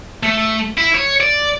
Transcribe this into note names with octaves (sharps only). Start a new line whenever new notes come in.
A3
E4
C#5
D5